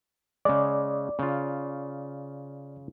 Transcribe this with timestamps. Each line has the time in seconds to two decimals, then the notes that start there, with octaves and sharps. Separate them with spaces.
0.45 C#3 G#3 D5
1.19 C#3 F4